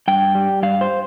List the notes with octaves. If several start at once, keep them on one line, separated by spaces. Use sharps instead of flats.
G2 G5
G3
G2 F5
C5